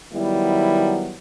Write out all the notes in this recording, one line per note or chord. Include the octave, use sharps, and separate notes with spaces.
D#3 F#3 G3 B3 E4